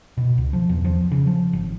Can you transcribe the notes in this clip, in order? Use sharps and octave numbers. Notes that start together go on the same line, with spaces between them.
B2
C#2
F3
E2
F3
C#3
F3
G#1